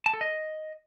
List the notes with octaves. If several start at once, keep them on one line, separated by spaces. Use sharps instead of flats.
A5
A4
D#5